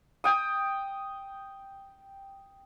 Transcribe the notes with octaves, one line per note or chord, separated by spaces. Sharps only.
G5 D#6